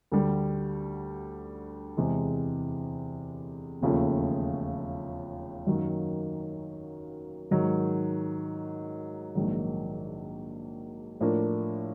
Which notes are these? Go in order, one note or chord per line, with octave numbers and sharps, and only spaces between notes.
D2 D3 G3
E2 C3 E3 G#3
E1 D#2 C#3 F3 A3
F#2 D#3 F#3 A#3
G#2 D#3 F#3
A#1 G#2 D#3 F#3
A2 F3 A#3 D4